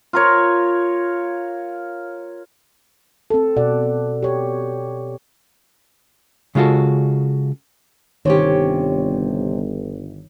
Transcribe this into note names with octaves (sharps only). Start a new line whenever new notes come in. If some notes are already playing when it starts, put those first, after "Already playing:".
F4 A#4 C#5
C4 A4
B2 D5 F#5
G4 C#5
C#3 G#3 F4 F#4 A4
G1 C3 D#3 C#4 G4 C#5